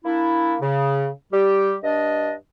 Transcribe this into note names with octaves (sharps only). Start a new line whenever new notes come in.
A#3 D4 E4
C#3
G3 G4
G2 D4 D#5